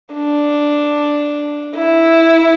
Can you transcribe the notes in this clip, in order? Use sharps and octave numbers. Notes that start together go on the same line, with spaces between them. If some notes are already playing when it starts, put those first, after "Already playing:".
D4
E4